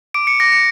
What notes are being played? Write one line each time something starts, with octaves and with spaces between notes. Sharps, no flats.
D6 D7
C#7
D6 A#6
C#7